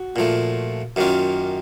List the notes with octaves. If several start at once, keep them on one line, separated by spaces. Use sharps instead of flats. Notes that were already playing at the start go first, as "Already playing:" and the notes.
Already playing: F#4
A#2 F3 A3
F#2 D#3 A#3 C#4 F4